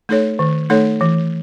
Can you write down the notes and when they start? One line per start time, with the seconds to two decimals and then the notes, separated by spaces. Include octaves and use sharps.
0.09 A3 D#4 A4 C#5
0.39 D#3
0.70 A3 D#4 A4 C#5
1.01 E3